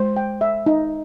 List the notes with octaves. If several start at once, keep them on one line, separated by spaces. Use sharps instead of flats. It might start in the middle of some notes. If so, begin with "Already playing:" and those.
Already playing: G#3 C5
G5
E5
D#4